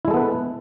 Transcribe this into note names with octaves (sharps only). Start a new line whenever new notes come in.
G#3 B3 E4 A4 B4